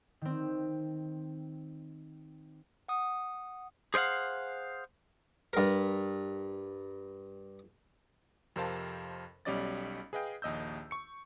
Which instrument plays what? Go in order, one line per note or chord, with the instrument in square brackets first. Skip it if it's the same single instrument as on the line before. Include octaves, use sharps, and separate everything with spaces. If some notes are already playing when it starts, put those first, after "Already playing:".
[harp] D#3 C4
[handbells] F#5 D#6
[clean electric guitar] G#4 C5 D5 F5 F#5
[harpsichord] G2 A#4
[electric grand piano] F2 C3 A#4 C5 F5 A5
B1 G3 C#4 D5 D#5 A6
G#4 B4 D#5 F5 G5
A#1 D#2 D#5 E6 G6
C#6 C#7